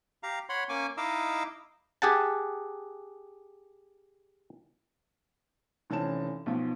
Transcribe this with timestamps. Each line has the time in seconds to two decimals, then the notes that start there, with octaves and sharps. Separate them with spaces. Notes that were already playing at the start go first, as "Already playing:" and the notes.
0.23 G4 F5 A#5
0.49 C#5 F#5 B5 C6
0.69 A#3 C#4 G#5 C#6 D6
0.97 D#4 E4 D#5 F5 D6 E6
2.02 G4 G#4 F#5 A5
5.90 F1 E3 C4 C#4 A5 E7
6.46 B1 B2 F3